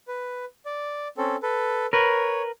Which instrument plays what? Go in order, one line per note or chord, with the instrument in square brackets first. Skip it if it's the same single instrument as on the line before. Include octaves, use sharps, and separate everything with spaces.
[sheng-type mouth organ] B4
D5
C4 C#4 A4
A4 B4
[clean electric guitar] A#4 B4 [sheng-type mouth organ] C#5